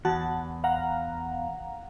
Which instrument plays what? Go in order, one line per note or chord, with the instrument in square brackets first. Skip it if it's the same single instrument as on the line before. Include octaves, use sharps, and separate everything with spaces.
[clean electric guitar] E2 [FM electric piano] F#4 F#5 A5
[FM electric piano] F5 F#5 A#5